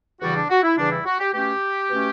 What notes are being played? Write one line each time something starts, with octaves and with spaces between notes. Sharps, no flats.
E2 C#3 E3 G3 F#4
D4
F#4
E4
E2 C#3 E3 G3 D4
E4
F#4
G4
B2 A3 C#4 G4
B2 A3 C#4